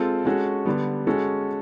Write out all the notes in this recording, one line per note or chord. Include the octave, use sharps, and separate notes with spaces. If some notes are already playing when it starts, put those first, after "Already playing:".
Already playing: G#3 C4 F4 A4
G#3 C#4 F#4 A4
D3 G3 B3
G#3 C#4 F#4 A4